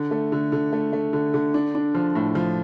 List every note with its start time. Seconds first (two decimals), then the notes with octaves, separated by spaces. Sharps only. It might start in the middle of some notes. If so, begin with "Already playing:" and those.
Already playing: D3
0.11 A3
0.32 D3
0.52 D3
0.73 A3
0.93 A3
1.13 D3
1.34 D3
1.54 D4
1.75 D4
1.95 F3
2.15 A2
2.35 F3